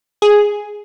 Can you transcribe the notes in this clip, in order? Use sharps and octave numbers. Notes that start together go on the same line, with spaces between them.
G#4